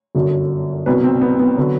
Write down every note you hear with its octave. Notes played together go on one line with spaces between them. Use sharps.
G1 F#2 D3 F#3
C2 B2 F#3 B4
C4
B3
B3
D3 F#3